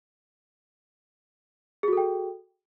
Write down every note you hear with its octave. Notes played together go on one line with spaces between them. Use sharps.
F#4 G#4 A4 G5